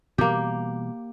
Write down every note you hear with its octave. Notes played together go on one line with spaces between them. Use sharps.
B2 E3 G3 A#3 G4